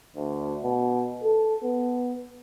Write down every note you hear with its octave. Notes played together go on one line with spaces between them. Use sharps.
D2
B2
A4
B3